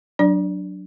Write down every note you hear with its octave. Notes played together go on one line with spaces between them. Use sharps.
F#3 D4 D5